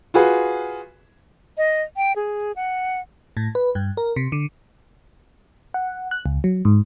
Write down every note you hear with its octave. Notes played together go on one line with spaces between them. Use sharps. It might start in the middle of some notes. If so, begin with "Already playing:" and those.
F4 F#4 G#4 B4
D#5
G5
G#4
F#5
A2
B4
G2
A#4
C3
D3
F#5
F#6
C#2
F#3
G#2